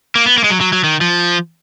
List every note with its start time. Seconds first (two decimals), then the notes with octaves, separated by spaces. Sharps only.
0.15 A#3
0.26 B3
0.38 A#3
0.44 G#3
0.50 F#3
0.61 F#3
0.73 F#3
0.84 D#3
1.01 F3